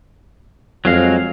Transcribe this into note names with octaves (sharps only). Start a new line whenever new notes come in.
F2 F#3 G#3 F5